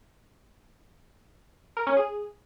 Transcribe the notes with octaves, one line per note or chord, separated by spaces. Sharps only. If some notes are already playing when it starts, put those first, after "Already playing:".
A#4
C#4
G#4